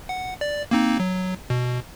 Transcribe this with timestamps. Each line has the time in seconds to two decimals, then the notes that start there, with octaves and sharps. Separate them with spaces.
0.09 F#5
0.41 D5
0.71 A#3 C4 D#4
1.00 F#3
1.50 B2